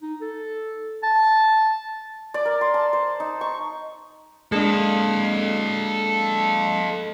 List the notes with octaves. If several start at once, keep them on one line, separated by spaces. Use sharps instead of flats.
D#4
A4
A5
D5
A#4
C6
A5
C5
D#4
C#6
G#3 A#3 D4 A4 D#5